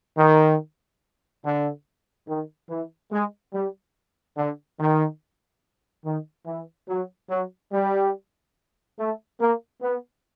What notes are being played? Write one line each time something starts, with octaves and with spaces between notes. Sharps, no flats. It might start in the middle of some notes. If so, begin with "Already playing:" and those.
D#3
D3
D#3
E3
G#3
G3
D3
D#3
D#3
E3
F#3
F#3
G3
A3
A#3
B3